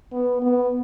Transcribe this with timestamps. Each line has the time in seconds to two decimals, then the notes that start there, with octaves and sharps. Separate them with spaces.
0.12 B3
0.42 B3